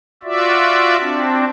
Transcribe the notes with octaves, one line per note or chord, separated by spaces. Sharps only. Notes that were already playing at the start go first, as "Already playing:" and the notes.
F4 F#4 D5 E5
C4 D4